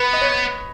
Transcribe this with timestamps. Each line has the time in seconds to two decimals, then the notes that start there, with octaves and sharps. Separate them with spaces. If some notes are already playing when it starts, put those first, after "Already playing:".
Already playing: B3 B4
0.13 D#5
0.21 C#5